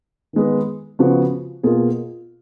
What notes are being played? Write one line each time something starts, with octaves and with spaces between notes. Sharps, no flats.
D#3 G#3 B3
C#3 F3 B3 F#4
B2 A#3 F4 G#4